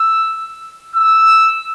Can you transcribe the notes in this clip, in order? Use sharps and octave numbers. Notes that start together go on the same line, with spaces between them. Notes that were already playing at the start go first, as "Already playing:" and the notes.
Already playing: E6
E6